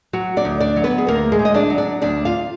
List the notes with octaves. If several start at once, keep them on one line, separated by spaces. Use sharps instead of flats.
F#3 F#4
D4 D5
D2
D4 D5
F#3
B3 B4
G#4
D2 A#3 A#4
G#3 G#4
D2
D#5
D4 D5
F#3
D4 D5
D2 D4 D5
F4 F5